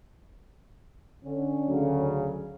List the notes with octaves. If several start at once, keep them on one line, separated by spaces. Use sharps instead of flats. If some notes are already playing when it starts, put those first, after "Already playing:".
D3 C#4
D2 C#3 F#3